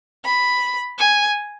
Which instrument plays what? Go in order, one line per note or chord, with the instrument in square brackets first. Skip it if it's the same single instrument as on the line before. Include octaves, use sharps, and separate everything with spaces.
[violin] B5
G#5